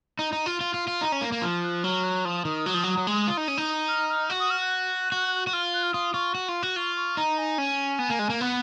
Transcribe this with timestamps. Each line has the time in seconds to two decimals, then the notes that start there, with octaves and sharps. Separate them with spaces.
0.19 D#4
0.33 D#4
0.46 F4
0.61 F4
0.74 F4
0.88 F4
1.01 D#4 A#5
1.12 C#4
1.21 A#3 A#5
1.32 A#3
1.42 F3 F6
1.63 F#6
1.84 F#3 F6
2.04 F#6
2.25 F3 D#6
2.45 D#3
2.66 F#3
2.74 F3
2.84 F#3
2.97 F#3
3.07 G#3
3.28 F4
3.37 D#4
3.48 C#4
3.57 D#4
3.88 F6
4.09 F6
4.30 F#4
4.40 D#6
4.50 F6
4.61 F#6
5.12 F#4
5.47 F#4
5.53 F4 F6
5.74 F#6
5.83 F6
5.93 F4 D#6
6.14 F4 C#6
6.35 F#4
6.49 F4
6.63 F#4
6.76 F4 C#6
6.96 C#6
7.17 D#4 A#5
7.38 G#5
7.58 C#4
7.99 B3
8.10 A#3
8.19 G#3
8.30 A#3
8.41 B3 F#5